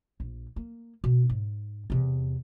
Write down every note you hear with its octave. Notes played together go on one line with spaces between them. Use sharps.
A#1
A#3
B2
G#2
E2 C3